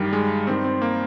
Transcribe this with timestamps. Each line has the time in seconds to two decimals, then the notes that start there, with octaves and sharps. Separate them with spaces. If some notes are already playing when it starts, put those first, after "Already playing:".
Already playing: G2 D#3 G3
0.13 G#3
0.47 G2 D#3 C4
0.64 C4
0.82 A#3